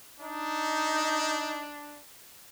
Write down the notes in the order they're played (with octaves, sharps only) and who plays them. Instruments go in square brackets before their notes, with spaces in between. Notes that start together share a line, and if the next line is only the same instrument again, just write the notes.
[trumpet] D4 [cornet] D#4